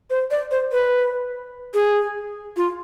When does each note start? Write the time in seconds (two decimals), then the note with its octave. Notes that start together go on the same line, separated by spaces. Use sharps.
0.10 C5
0.31 D5
0.51 C5
0.72 B4
1.74 G#4
2.56 F4